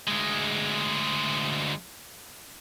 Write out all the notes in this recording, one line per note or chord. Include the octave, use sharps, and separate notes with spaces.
D2 G#3